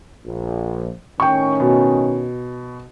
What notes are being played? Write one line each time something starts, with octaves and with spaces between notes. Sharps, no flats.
A#1
A2 D#3 C#4 G5 C#6
B2